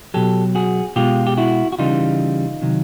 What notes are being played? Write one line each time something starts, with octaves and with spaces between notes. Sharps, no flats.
B2 F#3 G4 A4
F#4 G#4
B2 G#3 F4 G4
G4
E4 F#4
F#4
C#3 E3 G3 D#4 F4
C3 D#3 F#3